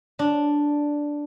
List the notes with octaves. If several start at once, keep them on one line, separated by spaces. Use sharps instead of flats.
D4